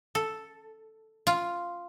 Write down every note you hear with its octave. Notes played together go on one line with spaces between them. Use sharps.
A4
F4